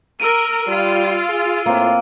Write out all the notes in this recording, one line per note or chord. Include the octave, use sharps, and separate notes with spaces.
A#4 E6 D7 D#7
G3 F4
G#4
A2 A#3 C4